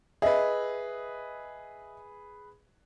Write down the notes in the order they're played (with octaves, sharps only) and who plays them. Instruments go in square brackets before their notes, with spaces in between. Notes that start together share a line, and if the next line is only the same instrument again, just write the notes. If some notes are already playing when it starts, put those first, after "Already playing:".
[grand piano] G#4 B4 [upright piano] D#5 E5